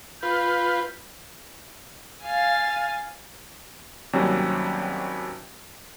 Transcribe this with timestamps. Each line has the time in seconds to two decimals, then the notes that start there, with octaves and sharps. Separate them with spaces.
0.23 F4 B4 G6
2.25 F5 G#5 A6
4.13 D#2 C3 F#3 G3 C#4